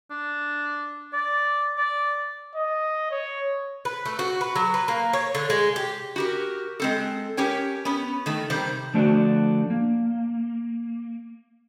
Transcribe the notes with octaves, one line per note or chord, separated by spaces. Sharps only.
D4
D5
D5
D#5
C#5
B4
A3
F#4
B4
F#3
B4
A#3
C#5
D3
G#3
G4
F#4 G4 A#4
G#3 C4 A4
C#4 G4 A#4 C#5 G5
B3 C#4
D#3 A3
C3 D#3 G3 C5
D3 F3 A3 D4 F#4 C5
A#3